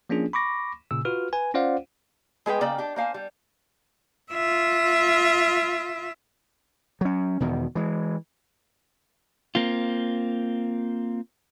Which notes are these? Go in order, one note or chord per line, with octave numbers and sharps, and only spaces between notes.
F3 A#3 C#4 D4 F4 G#4
B5 C#6 D6 A#6
A#2 C#3 E6
F4 F#4 B4 F6
B4 G#5
C#4 F4 C5 D5 F5 F#5
G#3 G#4 B4 G5
C#3 A#3 D5 G5
D4 G4
A#3 C5 F5 G#5
G3
F4 E5
F#3 C#4
E2 B2 D#3
E3 G#3
A#3 C4 F4